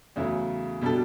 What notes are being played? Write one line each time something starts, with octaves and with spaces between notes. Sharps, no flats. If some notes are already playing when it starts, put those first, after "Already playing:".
E2 C#3 F#3 A3 E4
B2 G3 D4 F#4 A4